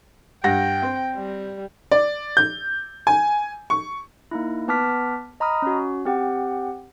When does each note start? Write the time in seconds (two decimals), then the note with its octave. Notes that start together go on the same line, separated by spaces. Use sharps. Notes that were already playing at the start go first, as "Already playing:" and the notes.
0.44 G2 F#5 G5 A#6
0.82 C4
1.15 G3
1.91 D5
2.37 G6
3.07 G#5
3.70 C#6
4.31 A#3 D#4 E4
4.68 B3 B4 A5 D6 F6 B6
5.40 D#5 A#5 B5 D#6 F6
5.62 C#4 F#4
6.05 C4 G4 F#5 G5